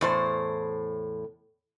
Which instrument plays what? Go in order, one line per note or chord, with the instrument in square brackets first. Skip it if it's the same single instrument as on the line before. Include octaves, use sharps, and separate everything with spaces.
[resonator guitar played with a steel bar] E2 A2 C5